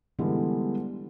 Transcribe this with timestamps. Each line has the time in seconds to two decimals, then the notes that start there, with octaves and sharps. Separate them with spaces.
0.19 D3 E3 G3 G#3 B3